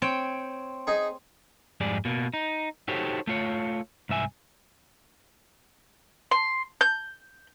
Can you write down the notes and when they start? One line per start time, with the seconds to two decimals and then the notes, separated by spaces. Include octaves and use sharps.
0.02 C4 C#5 G5
0.87 D#4 G#4
1.80 F2 G#2 G3 G#4 D5
2.05 B2 A#3
2.34 D#4
2.88 D#4 F#4 G4 A4 C5 C#5
3.27 A3 F4 C#5
4.09 C2 G#2 E5 G#5
6.31 C6
6.81 G6